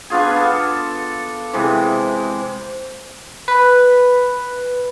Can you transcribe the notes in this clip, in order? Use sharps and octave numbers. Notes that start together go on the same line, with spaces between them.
B3 D4 F4 G#4
A4
C3 E3 G#3
B4